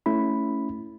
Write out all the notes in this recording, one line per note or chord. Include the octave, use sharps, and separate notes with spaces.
A3 C#4 E4 B5